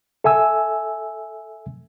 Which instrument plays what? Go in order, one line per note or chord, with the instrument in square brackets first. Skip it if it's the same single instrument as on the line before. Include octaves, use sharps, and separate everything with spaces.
[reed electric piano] A4 E5 G#5 E6